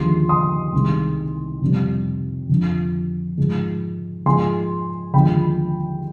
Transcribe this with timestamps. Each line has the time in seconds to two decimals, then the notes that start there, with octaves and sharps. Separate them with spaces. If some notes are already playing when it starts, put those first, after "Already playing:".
Already playing: D#2 D3 F3 G#3 C6
0.29 C6 D#6
0.73 C2 C3 D#3 G#3
1.61 F2 C3 G3
2.49 F2 D3 F3
3.37 G#2 F3 G#3
4.25 G#2 F3 G#3 G#5 C6
5.14 D#2 D3 F3 G#3 G5 B5